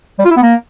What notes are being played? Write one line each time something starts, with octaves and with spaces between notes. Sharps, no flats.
G3
F4
E4
B3
A#3